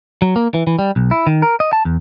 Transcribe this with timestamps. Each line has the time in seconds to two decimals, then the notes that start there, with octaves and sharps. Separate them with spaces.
0.22 F#3
0.36 A#3
0.54 E3
0.67 E3
0.79 G3
0.96 B1
1.11 E4
1.27 D#3
1.42 A#4
1.60 D#5
1.73 A5
1.85 E2